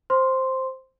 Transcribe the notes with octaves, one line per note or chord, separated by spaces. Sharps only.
C5 C6